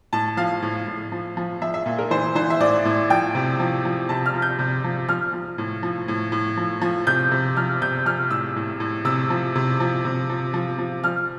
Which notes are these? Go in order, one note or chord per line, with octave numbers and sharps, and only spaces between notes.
A2 A5
F3 F5
A2
A2
F3
F3
F3 E5
E5
A#2
A#4
E3 C5
E3 C5
E5
A2 D5
A2
F3 G5
C3
F3
F3
C3 A5
F6
F3
G6
C3
F3
F3 F6
F3
A2
F3
A2
A2
F3
F3
C3 G6
C3
F3 F6
C3 G6
F3 F6
A2 E6
A2
A2
C3 E6
F3
C3
F3
C3
F3
F3
F3
F3 F6